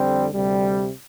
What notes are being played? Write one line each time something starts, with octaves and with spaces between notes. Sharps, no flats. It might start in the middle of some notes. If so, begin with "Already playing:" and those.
Already playing: F2 D3 G3 C4
D2 C3 G3